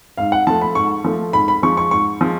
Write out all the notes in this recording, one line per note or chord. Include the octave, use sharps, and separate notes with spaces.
G#2 F5
F#5
F3 A3 A5
B5
G#2 C#6
F3 A3
G#2 B5
B5
F3 G#3 C#6
C#6
G#2 C#6
F3 G#3